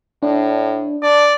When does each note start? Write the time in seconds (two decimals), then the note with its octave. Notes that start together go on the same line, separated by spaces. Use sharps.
0.23 A2 D4
1.03 D4 D5